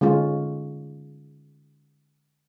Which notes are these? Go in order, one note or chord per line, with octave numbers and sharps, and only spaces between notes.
D3 G#3 C#4 F4